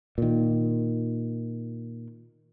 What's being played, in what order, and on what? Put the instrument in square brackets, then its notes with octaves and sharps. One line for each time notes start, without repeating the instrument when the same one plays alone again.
[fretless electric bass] A#2 D#3